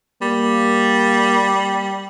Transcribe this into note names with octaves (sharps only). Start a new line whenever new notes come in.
G3 A#3